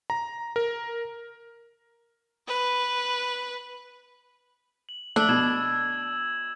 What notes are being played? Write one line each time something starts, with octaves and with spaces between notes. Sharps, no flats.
A#5
A#4
B4
F#7
A3 D4 E6 F#7
B2 G#6 E7 F#7